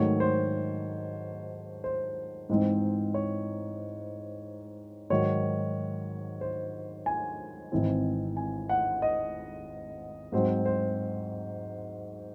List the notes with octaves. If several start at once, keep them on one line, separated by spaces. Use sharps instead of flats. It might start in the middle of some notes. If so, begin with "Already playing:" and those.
Already playing: G#2 D#3 F#3 A3 D#4 C#5
C5
C5
G#2 E3 G#3 C4 D#4
C#5
G#2 D#3 F#3 C#5
C5
G#5
G#1 G#2 E3 C4
G#5
F#5
D#5
G#2 F#3 C4 C5
C5